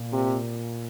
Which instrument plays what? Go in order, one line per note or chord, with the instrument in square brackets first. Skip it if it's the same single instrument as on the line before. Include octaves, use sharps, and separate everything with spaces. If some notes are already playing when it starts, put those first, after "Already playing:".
Already playing: [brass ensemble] A#2
[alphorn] C3